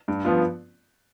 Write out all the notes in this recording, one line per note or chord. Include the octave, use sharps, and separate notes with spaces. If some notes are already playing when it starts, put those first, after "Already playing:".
G2
F3 B3 F4